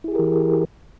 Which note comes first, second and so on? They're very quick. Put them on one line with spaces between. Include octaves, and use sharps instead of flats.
E4 G#4 G4 A#4 E3